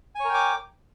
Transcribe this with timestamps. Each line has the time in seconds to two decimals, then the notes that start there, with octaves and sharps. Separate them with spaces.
0.15 G#5
0.20 C#5
0.25 A#4
0.29 G5
0.34 D6